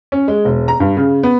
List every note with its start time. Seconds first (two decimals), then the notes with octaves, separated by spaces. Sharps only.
0.12 C#4
0.28 G#3
0.45 E1
0.68 A#5
0.80 G2
0.97 C#3
1.23 B3